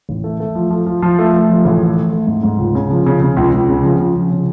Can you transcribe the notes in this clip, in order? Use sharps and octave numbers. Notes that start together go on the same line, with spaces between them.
A1
A3
A3
F3
F3
F3
F3
A3
A3
F3
A1
A3
A3
A3
G#2
G#2
C#2
C#3
F3
C#3
C#3
C#2
C#2
C#3
F3
C#3
F3
C#3